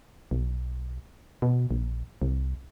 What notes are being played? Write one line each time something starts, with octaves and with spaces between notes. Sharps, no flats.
B1
B2
A#1
C2